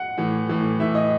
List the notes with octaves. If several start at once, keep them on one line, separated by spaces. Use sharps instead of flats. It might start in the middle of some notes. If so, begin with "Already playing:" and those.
Already playing: F#5
A2 E3
A2 E3
A2 E3 E5
D#5